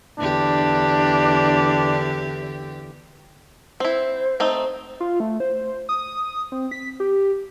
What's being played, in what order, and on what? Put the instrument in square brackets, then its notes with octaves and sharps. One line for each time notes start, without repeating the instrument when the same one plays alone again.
[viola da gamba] E2 D3 G4 [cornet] D4
[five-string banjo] C4 E4 [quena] C5
[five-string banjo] A3 C4 D#4
[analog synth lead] F4
A3
C5
D#6
C4
B6
G4